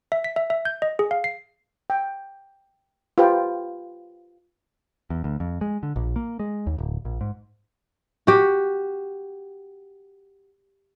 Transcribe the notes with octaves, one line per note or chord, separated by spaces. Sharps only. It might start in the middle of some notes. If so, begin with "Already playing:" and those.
E5
B6
E5
E5
G6
D#5
G#4
F5
C7
G5
F4 G4 B4 C5 G5 A#5
E2
D2
F2
G#3
D3
A#1
A#3
G#3
D#2
D1
A#1
G#2
F#4 G4